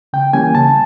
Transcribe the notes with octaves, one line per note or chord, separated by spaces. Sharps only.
C#3 G5
E3 G3 A#3 C#4 G#5
C#3 A5